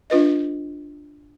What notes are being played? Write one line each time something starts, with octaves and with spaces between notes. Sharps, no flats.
D4 F4 B4 D#5